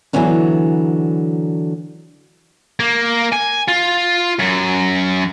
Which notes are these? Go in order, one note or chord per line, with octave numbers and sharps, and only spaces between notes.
D3 E3 F#3 B3 C#4 D4
A#3
G#5
F4
F#2